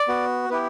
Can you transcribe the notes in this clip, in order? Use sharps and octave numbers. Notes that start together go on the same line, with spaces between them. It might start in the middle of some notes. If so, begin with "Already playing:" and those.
Already playing: D5
B3 F#4
B3 E4 G4 B4